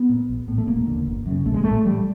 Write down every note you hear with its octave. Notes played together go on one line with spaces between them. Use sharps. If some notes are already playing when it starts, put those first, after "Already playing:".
Already playing: B3
A#2
A#1
A2
A3
E1 A#3
D#2 D3
G1
F#2
C#3
A#1 A3
G#3
A2 A3
A1 G3